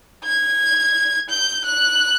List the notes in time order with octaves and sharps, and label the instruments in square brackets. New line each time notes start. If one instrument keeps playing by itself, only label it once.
[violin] G#6
G6
F#6